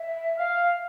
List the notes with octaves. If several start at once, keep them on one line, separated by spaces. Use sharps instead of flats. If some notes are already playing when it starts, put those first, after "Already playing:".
Already playing: E5
F5